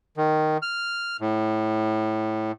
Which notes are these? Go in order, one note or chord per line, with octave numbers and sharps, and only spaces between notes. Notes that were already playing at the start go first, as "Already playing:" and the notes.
D#3
F6
A2